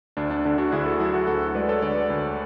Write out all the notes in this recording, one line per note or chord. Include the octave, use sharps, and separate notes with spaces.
D2 D4
D4
D3 D4
D4 F#4
D2 E4 G#4
F#4 A4
F#3 E4 G#4
F#4 A4
D2 F#4 A4
G#3 B4 D5
A4 C#5
D3 B4 D5
D2